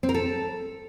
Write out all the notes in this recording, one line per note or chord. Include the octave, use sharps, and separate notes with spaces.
C4
A#4
A4